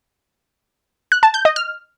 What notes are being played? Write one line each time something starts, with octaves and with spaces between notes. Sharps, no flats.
F#6
A5
G6
D#5
F6